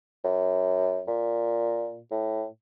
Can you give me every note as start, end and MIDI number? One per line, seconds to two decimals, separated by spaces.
0.24 1.02 42
1.07 2.00 46
2.11 2.45 45